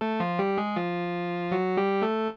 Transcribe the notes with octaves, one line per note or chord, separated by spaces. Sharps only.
A3 A4
F3 F4
G3 G4
G#3 G#4
F3 F4
F#3 F#4
G3 G4
A3 A4